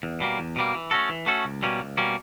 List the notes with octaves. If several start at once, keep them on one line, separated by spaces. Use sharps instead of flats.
E2
B2 G3 A#3
E2
B2 G3 A#3
E3
A3 C#4 F#4 A4
E3
A3 C#4 F#4 A4
C#2
B2 G3 A#3 C#4
C#2
B2 G3 A#3 C#4